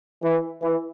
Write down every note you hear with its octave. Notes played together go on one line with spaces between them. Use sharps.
E3
E3